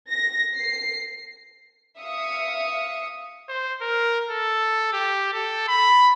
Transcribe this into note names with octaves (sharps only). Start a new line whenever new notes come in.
A#6
C7
E5 F5 D#6 C#7
C5
A#4
A4
G4
A4
B5